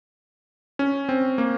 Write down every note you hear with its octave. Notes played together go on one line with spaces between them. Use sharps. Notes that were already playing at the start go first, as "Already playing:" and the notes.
C#4
C4
A#3